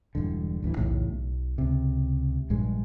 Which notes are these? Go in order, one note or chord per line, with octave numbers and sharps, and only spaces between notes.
E1 G2 D3
D1 A1 D2 E3
B1 E2 A2 C#3
B1
C#2 C3
A#1 G2 G#3